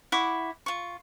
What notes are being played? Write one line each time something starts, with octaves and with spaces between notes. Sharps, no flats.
E4 F#5 C#6 D6
F4 C#6